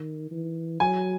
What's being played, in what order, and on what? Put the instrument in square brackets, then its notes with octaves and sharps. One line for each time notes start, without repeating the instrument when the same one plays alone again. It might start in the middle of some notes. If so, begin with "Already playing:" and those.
Already playing: [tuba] D#3
E3
[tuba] F#3 [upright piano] G#5